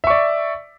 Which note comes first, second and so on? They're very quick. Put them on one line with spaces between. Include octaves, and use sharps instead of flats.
E5 C#6 D5